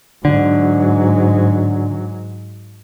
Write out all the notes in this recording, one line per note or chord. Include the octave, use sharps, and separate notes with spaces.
G#2 D3 F#3